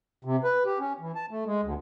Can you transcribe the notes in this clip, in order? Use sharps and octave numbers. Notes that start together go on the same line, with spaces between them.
C3
B4
G4
C#4
E3
A5
A3
G#3
D2